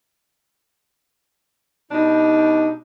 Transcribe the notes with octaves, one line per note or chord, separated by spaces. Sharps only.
B2 G3 D4 D#4